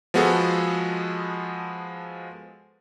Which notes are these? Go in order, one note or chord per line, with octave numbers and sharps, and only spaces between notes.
F3 G#3 B3 F#4 G#4 A4